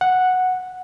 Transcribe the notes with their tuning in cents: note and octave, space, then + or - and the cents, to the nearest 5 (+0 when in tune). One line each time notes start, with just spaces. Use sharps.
F#5 -5